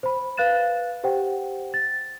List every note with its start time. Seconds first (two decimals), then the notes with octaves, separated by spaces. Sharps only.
0.03 C5 B5
0.37 B4 F5 F#6 A6 E7
1.04 G4 C5 F#5 G5
1.74 A6